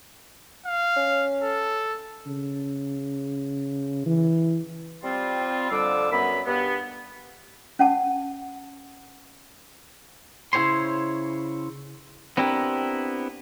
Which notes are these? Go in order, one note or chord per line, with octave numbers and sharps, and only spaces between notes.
F5
C#4
A4
C#3
E3
G3 C4 F4
F2 D3 F3 G3 D6 E6
F#2 B3 B5
G2 B3
C#4 F#5 A5
C#3 E4 G4 C5 C#5 C6
B3 C4 D4 E4 G4 A#4